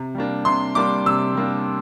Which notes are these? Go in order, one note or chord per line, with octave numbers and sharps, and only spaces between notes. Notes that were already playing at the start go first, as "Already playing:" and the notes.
Already playing: C3
G3 A#3 D4
C3 C6
G3 A#3 D4 D6
C3 E6
G3 A#3 D4